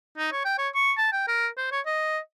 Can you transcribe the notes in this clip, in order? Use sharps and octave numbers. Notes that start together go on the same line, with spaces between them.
D#4
C#5
G5
C#5
C#6
A5
G5
A#4
C5
C#5
D#5